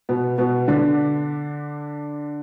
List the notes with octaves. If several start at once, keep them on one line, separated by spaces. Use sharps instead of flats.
B2 B3
B2 B3
D3 D4